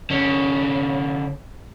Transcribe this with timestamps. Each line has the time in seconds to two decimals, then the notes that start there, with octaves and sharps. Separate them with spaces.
0.10 D3 C#4